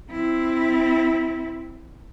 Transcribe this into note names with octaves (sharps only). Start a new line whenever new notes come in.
C4 E4